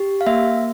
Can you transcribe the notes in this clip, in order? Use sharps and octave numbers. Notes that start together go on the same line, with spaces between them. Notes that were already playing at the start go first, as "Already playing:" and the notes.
Already playing: G4
F5
A#3 E5